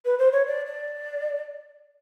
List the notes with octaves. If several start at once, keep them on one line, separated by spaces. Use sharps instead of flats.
B4
C5
C#5
D5
D5